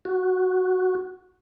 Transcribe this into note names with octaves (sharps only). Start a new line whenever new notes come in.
F#4